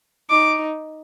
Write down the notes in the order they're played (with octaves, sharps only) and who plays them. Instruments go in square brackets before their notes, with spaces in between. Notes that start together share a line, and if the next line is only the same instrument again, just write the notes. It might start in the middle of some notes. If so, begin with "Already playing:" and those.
[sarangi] D#4 [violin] D6